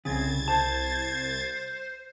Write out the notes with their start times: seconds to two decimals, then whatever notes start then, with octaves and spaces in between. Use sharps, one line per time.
0.05 C2 C#3 C4 G#6 A6
0.48 C5 A5